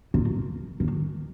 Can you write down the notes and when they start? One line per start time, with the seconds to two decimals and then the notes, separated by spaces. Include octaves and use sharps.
0.14 A#2
0.80 D#3